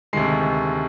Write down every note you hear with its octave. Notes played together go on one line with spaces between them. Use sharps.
D2 C3 D#3 G#3 C7